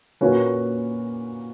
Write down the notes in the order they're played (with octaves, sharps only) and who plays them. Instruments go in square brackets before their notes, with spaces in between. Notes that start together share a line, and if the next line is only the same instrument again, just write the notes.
[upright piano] A#2 A#3 C#4 F#4 B4